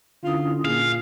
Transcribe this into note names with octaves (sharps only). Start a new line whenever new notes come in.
D3 C#4 E4 F4 D#6
A#2 G#4 F5